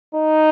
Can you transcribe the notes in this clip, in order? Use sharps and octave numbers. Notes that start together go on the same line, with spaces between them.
D#4